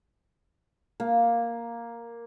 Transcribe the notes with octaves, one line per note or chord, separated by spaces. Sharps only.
A#3